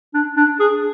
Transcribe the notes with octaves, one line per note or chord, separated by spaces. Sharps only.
D4
D4
G#4